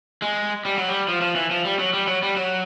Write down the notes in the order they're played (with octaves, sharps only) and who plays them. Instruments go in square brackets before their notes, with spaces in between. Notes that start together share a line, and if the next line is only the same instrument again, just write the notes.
[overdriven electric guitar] G#3
G3
F#3
G3
F3
F3
E3
F3
G3
F#3
G3
F#3
G3
F#3